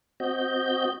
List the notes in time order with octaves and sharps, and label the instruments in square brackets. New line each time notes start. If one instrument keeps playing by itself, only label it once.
[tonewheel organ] C4 F#4 D#5 G6